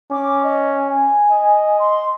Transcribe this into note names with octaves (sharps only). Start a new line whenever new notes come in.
C#4 D6
D#5
G#5
D#5
C6